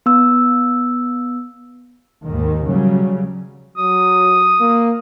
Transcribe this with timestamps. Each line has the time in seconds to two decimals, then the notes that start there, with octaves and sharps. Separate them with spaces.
0.06 B3 E6
2.23 D#2 G#2 D#3
2.66 C#3 F#3 G3
3.77 F#3 D#6
4.61 A#3